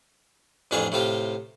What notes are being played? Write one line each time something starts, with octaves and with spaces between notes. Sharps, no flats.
A1 F2 D4 F4 G#4 C#6
A2 C3 F4 G4